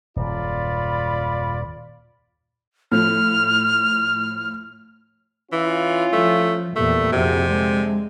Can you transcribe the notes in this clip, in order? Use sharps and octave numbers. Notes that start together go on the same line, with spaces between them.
D#1 F#2 F4 D5 B5
A2 F3 F6
E3 C#4 E4 F4
F3 A3
E2 A#2 G3 A3
F2 C3 E4 F#4 G#4
D3 G#3 G#4